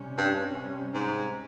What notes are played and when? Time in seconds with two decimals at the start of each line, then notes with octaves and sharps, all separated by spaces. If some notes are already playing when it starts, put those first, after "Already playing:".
Already playing: C3 G3 C#4
0.18 G2
0.94 G#2